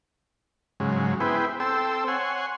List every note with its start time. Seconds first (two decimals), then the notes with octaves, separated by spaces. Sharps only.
0.80 G#2 C#3 F#3 G#3
1.20 B3 E4 G#4 B4 C5 G5
1.60 C4 A4 C5 G5 E6
2.08 C#5 F#5 G#5 C6